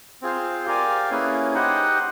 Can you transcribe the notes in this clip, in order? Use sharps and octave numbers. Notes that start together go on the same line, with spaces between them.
C4 F4 G#4 C5 F5
G4 A#4 D5 F5 G#5
A#3 C#4 E4 G#4 B4
D#4 G4 C5 D#5 F#5